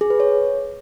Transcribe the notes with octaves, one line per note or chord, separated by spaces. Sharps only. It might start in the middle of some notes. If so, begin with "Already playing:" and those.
G#4
B4
C#5